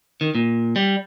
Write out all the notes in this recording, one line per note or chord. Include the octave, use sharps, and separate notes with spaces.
D#3
A#2
G3